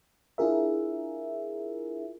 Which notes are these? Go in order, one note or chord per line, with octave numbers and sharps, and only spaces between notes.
D4 E4 F4 G#4 A#4 E5